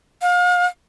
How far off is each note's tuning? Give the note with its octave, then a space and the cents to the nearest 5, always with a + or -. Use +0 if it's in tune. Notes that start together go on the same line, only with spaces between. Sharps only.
F5 +35